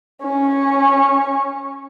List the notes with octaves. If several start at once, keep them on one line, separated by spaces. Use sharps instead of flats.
C#4 C#6